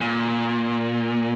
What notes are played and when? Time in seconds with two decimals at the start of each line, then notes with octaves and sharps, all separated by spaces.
0.01 A#2